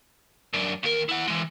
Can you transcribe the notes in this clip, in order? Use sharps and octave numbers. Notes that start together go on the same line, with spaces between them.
F#2 D4
D#2 A#4
E4 F#5
E3 G#3